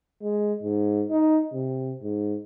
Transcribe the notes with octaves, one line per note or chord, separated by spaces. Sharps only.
G#3
G#2
D#4
C3
G#2